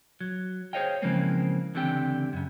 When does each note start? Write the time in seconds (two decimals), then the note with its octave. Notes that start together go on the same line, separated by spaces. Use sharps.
0.21 F#3
0.73 G#4 C5 C#5 D#5 F5 G5
1.02 C#3 E3 F3 G#3 A#3 C4
1.75 C#2 D3 E3 C4 G4 G5
2.33 F#2 C#3